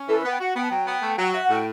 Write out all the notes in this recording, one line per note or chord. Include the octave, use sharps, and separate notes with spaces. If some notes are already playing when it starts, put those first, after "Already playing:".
Already playing: C#4
E3 A4
B4
B3
G5
F#4 F#5
B3 G5
A5
F#3 G5
B3
A3
F#3
F#4 E5
F#5
A2
G5